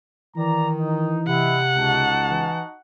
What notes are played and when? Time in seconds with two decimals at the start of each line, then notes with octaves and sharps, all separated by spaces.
0.37 D#3 E3 D5 A#5
0.79 D#4
1.28 C3 D#5 E5 F#5 B5
1.76 C#2 D#4 F#4 A5
2.30 E3